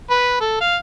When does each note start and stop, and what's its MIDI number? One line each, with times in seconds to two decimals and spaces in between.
0.10 0.40 71
0.41 0.57 69
0.61 0.77 77